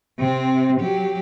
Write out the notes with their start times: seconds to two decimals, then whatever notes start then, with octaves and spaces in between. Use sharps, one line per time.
0.19 C3 C4
0.80 F#3 G4